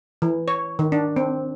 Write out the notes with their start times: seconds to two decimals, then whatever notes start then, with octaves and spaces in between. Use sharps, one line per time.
0.22 E3
0.48 C#5
0.79 D#3
0.92 D4
1.16 C4